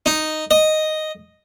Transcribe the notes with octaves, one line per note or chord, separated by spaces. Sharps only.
D#4
D#5